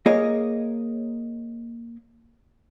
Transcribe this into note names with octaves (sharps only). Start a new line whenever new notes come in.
A#3 G#4 A#4 C#5 D#5